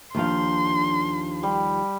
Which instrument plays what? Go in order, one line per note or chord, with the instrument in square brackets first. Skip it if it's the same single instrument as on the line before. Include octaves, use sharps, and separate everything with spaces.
[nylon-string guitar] D#2 F3 F5 [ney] D4 [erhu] C6
[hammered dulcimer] G3